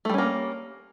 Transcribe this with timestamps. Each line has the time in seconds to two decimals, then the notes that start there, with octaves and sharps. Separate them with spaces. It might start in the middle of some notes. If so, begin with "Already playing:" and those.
0.05 A3
0.09 G3
0.14 C#4
0.18 A#3